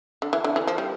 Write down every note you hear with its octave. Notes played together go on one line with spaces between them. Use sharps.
D3
E3
D3
E3
F3
G3